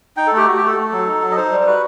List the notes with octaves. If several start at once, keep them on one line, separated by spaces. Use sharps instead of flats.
D#4 G5
A4
A3 G4
F#4
G4
A3 A4
A3
F#3
D#4
F#3
D#5
D#4 C5
G3
C5
F#4 B4